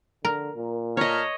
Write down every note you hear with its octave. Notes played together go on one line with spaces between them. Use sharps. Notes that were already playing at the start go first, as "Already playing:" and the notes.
D3 A#4
A#2
A3 C#5 D#5 A#5 F6